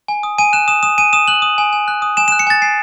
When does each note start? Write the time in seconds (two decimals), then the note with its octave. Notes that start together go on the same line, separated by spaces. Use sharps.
0.08 G#5
0.23 D#6
0.38 G#5 D#7
0.53 F#6 E7
0.68 D#6 E7
0.83 D#6 E7
0.98 G#5 D#7
1.13 D#6 E7
1.28 F#6 F#7
1.42 D#6
1.58 G#5
1.73 G#5
1.88 F#6
2.02 D#6
2.17 G#5 E7
2.28 E7
2.32 F#6
2.39 C#7
2.47 G#5 A6
2.62 G#5 C7